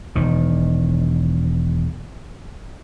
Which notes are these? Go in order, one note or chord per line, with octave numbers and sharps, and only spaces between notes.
E1 D#3